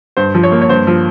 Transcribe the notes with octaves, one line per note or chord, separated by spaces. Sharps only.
G2 C5
F3
C#5
A#3
C#5
G2 C5
F3